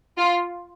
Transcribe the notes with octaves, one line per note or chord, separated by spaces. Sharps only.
F4